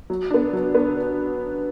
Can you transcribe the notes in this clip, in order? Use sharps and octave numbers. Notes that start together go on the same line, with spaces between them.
F#3
B3 D4
F#3
B3 D4